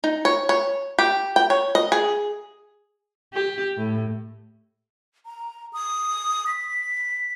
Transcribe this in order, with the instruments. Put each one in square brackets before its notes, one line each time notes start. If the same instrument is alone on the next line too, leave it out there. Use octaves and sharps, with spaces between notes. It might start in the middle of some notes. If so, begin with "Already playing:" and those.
[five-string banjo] D#4
C#5
C#5
G4
G5
C#5
D#5
G#4
[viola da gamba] G4
A2
[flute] A#5
D#6
B6